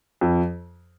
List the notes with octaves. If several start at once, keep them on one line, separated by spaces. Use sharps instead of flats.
F2